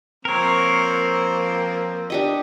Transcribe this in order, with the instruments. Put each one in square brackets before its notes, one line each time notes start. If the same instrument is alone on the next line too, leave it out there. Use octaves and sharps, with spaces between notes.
[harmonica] F3 A#3 C4 [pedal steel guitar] A#4 C#5
[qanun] D4 G4 D#5